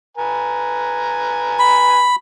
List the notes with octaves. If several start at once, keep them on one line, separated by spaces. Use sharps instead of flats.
B4 G#5 A#5
B5